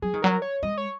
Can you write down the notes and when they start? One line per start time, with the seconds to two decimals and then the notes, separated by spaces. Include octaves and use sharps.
0.02 F#3 G#4
0.14 D#3
0.22 F#3 A#4
0.42 C#5
0.63 G#3 D#5
0.77 C#5